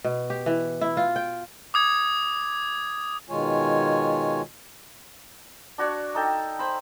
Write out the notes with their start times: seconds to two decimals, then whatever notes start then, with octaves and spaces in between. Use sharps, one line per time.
0.04 B2
0.30 G4
0.46 E3
0.81 E4
0.97 F4
1.16 G5
1.74 D6 D#6 G#6
3.30 B2 D#3 G#3 F4 C#5 G#5
5.78 D4 F#4 C#5 D5
6.15 D#4 A4 G5
6.59 C5 B5